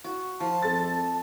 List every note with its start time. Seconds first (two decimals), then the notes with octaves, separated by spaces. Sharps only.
0.04 F#4
0.40 F3 A5
0.62 F2 A4 A6